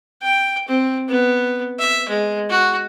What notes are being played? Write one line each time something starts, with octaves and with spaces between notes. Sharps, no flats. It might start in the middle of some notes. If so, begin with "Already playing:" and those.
G5
C4
B3
E5
G#3
F#4